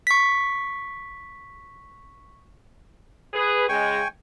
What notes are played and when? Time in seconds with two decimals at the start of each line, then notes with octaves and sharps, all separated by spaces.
0.07 C#6 B6
3.33 G#4 B4
3.69 C#3 G#3 G5 G#5 C#6